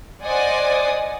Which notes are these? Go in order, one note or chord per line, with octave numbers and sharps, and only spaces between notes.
C5 D5 D#5 F#5 G#5 D#6